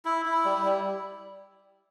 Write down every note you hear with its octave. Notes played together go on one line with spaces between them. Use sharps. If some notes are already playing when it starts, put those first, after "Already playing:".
E4
E4
G3
G3